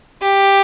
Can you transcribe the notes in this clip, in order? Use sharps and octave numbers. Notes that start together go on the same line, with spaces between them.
G4